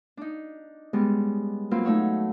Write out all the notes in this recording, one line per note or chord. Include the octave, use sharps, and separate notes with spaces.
D4 D#4
G3 G#3 B3 C#4
F#3 A#3 C4 F4 B4
A3 D#4 C#5 F#5 E6